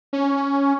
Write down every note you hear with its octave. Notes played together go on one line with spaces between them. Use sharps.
C#4